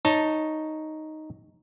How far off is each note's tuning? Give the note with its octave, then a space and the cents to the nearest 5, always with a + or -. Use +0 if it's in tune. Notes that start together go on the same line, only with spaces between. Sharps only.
D#4 +0 C#5 +0 A5 +20